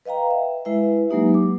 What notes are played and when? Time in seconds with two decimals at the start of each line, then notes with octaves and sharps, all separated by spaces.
0.05 B4 D#5 F5 G5 A#5
0.31 E5
0.65 G#3 E4 B4 E5
1.10 F#3 G#3 A#3 D#4 G4
1.34 D6